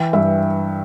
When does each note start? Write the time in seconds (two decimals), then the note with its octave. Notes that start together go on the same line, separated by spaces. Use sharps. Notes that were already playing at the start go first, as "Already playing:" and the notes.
Already playing: E3 G5
0.13 G2 E5